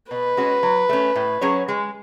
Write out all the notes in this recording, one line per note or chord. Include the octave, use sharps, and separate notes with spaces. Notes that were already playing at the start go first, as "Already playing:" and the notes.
B2 B4
G#3 C#4 F#4
F#3
A3 C#4
A2
F#3 C#4 G#4 C#5
G#3